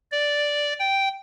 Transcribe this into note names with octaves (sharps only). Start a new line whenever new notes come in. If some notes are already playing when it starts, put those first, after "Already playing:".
D5
G5